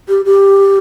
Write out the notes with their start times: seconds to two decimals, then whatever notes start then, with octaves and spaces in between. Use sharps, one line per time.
0.09 G4
0.25 G4